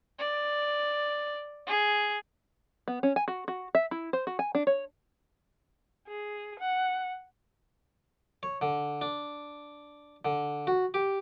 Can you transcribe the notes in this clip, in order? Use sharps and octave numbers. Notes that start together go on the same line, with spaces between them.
D5
G#4
B3
C#4
G#5
F#4
F#4
E5
E4
C5
F#4
G#5
D4
C#5
G#4
F#5
C#5
D3
D4
D3
F#4
G4